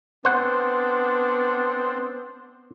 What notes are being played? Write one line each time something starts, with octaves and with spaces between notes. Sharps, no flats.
B3 C4 D4 C5 F#5